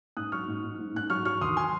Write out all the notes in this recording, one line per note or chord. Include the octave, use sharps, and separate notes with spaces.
G#2 D#6 F#6
F#3 C#6 F6
G#2
G#2
G#2
G#2 F#6
F#3 C#6 F6
F#3 C#6 F6
D#2 C6 D#6
G#5 C6